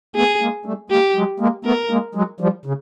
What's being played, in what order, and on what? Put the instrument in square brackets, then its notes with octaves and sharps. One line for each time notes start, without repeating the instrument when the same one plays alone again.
[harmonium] A3 B3 [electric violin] G#4
[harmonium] G#3 A#3
G3 A3
[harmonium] G#3 A#3 [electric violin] G4
[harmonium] F#3 G#3
G#3 A#3
[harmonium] A3 B3 [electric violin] A#4
[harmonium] G#3 A#3
F#3 G#3
F3 G3
C#3